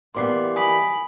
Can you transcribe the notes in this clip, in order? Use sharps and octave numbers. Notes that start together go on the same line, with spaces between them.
E3 G3 A#3 B3 C6 D6 C7
G#5 B5 D#6 B6